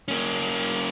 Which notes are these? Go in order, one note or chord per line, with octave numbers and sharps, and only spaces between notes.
A#3 C#4